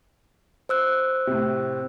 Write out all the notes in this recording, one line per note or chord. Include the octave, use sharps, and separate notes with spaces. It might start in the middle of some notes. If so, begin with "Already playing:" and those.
C5 E6 F#6
A2 C3